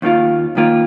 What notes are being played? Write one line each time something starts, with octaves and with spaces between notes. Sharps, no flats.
D#2 D#3 A#3 F4
D#2 D#3 A#3 F4